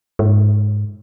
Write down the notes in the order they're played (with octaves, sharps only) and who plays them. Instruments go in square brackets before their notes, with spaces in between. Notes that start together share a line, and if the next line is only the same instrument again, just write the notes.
[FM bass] G#2